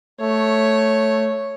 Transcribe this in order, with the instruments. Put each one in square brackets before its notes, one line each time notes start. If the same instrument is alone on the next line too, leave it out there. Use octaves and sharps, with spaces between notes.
[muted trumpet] A3 [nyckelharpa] C#5